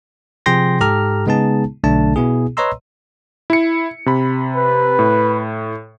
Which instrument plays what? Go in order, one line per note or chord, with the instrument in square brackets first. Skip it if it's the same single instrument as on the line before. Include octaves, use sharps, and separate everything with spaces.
[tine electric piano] C3 F3 G#4 G5 C6 A#6
G#2 G4 A4 A#5 F6
C#3 G#3 B3 D#4 G#4 A5
B1 D3 A3 D4 A5
B2 B3 E4 G#4
B4 C#5 D#5 A#5 C6 E6
[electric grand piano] E4 C#7
C3 B5
[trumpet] B4
[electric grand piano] A2